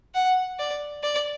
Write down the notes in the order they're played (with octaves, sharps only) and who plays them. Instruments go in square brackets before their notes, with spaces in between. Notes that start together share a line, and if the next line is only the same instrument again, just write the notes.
[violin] F#5
D5
D5